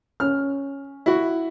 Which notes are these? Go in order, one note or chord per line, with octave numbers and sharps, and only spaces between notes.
C#4 F6
E4 F#4